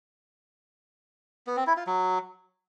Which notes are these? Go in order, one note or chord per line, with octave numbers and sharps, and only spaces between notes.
B3
C4
E4
F4
F#3